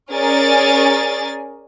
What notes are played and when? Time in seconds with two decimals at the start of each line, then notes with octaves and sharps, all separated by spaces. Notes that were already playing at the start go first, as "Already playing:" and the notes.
0.12 C#4 G#4 A#4 D5 G#5 A6